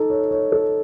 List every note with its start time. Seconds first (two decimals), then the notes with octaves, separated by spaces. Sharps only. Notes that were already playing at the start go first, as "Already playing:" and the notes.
Already playing: D#4 A4
0.10 C#5
0.31 C#5
0.52 A4